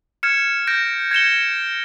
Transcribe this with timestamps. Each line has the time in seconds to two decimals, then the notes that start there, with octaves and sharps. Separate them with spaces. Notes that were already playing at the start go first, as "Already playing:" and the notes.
0.23 F6 G#6 C#7 E7
0.67 G6 A#6 D7
1.11 G#6 C#7 E7 G7